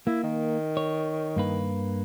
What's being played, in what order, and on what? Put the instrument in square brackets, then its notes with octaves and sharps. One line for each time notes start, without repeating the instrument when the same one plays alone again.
[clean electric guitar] A#3 [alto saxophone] E4
[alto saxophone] D#3
[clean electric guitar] C#5
G2 A#3 B4